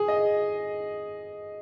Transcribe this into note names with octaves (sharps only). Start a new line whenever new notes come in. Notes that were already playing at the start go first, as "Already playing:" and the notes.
Already playing: G#4
D#5